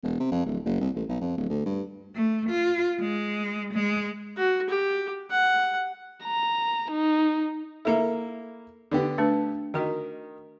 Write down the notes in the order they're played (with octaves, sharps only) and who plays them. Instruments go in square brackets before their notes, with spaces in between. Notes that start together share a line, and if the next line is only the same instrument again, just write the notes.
[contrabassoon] E1
C3
F2
D1
F#1
C2
A1
B1
F2
D1
D2
G2
[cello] A3
F4
G#3
G#3
[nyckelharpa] F#4
G4
F#5
[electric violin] A#5
D#4
[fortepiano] A#3 E4 [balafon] A4 A#4 E5
[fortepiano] D3 B3 G4
[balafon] A3 D4 B4
[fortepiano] D#3 [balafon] F#4 A#4 D#5